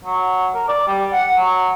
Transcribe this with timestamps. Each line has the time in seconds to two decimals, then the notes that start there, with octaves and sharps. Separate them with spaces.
0.05 F#3
0.55 A#4
0.68 D5
0.87 G3
1.13 F#5
1.37 F#3